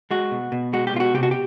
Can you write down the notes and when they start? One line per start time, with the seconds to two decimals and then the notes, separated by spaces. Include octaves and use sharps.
0.11 G#3 F#4
0.32 B2
0.52 B2
0.73 G#3 F#4
0.87 G4
0.94 B2 F4
1.00 F#4
1.14 C3 G4
1.23 F#4
1.31 G4